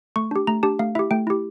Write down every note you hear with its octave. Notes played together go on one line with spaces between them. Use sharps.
A3 C#6
D4 G4
A3 A#5
D4 G4 A5
A3 F5
E4 G4 E5
A3 G5
E4 G4